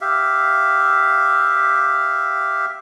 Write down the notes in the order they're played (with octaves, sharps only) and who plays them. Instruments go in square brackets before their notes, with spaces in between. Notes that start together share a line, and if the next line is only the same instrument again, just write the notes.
[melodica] G4 E5 F5